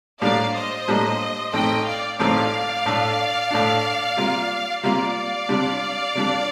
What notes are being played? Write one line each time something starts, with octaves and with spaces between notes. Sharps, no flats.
A2 G3 A#3 D4 D5 F5
C5 D#5
A2 G3 A#3 D4
A1 A2 A3 C4 D#4 D#5 G5
D5 F5
A1 A2 A3 C4 D#4 D5 F5
A2 A3 D4
A2 A3 D4
C3 G3 A#3 F4
C3 G3 A#3 F4 D5 F5
C3 G3 D4
C3 G3 D4